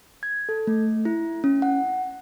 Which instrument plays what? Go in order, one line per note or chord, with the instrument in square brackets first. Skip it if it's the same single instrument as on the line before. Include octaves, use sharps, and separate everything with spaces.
[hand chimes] G#6
A4
A3
E4
C#4
F#5